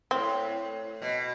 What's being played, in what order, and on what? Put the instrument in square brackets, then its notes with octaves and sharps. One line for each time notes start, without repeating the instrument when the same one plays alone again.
[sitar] A2 [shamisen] C4
[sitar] B2